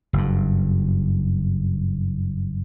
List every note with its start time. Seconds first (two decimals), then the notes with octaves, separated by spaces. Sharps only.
0.13 F#1 G2